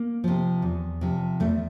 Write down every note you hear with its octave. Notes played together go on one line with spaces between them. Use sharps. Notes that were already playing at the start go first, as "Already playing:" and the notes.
Already playing: A#3
C3 F3
E2
C3 F3
E2 A3